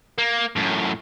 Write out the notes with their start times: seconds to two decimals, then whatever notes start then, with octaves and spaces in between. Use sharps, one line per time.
0.18 A#3
0.56 F#2 A2